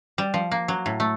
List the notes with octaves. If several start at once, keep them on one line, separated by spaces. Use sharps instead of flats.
G3
F3
A#3
F#3
A2
A3